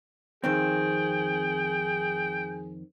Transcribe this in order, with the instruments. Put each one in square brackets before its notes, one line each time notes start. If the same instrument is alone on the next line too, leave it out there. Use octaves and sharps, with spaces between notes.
[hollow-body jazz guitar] F2 D#3 C4 [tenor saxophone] G#4 [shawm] G5